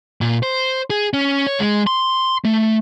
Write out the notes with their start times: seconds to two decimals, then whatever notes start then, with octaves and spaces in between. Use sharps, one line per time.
0.21 A#2
0.43 C5
0.90 G#4
1.14 C#4
1.47 C#5
1.60 G#3
1.87 C6
2.45 A3